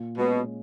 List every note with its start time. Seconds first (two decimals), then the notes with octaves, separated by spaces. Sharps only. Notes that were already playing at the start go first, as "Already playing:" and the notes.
Already playing: A#2
0.18 B2 G#3 C#4